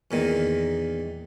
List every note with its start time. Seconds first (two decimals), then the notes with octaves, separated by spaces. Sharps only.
0.11 E2 A#2 D#3